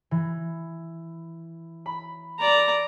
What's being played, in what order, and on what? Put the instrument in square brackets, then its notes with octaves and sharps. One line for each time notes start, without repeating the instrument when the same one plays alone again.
[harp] E3
B5
[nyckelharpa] D5 A#5